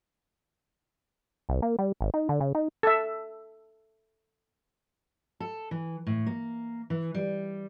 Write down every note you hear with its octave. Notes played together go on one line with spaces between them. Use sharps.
C2
A#3
G3
G#1
D#4
D3
C#3
D#4
A4 E5
A4
E3
A2
A#3
E3
G3